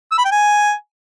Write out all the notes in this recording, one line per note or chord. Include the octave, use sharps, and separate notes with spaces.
E6
B5
G5
G#5